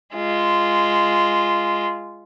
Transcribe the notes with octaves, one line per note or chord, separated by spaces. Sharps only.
G#3 F4